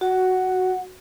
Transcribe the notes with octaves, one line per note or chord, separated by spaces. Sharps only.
F#4 F#5